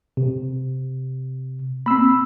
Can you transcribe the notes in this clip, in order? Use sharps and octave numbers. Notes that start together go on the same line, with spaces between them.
C3
A#3 C4 B5 E6